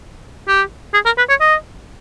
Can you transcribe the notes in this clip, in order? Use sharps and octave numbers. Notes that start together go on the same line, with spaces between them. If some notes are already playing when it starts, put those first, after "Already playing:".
G4
G#4
A#4
B4
C#5
D#5